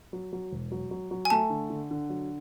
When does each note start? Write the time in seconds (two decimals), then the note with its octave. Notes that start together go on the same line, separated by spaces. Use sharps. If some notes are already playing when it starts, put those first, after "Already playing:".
0.13 F#3
0.33 F#3
0.52 E1
0.71 F#3
0.91 F#3
1.11 F#3
1.25 G#5
1.30 A3 A5
1.50 D3
1.70 D3
1.91 D3
2.10 F#3